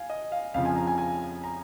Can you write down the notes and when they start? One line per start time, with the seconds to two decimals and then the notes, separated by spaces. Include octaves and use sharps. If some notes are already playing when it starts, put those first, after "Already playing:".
Already playing: F5 G#5
0.10 D#5
0.32 F5
0.54 F2 C#3 F3 F5
0.65 G#5
0.76 A#5
0.87 G#5
0.98 G#5
1.44 A#5